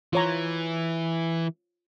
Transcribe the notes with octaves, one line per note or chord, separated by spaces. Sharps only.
E3 F4 C#5 A#5